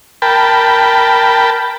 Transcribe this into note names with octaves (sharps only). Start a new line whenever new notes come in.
A#4 G5 A5 B5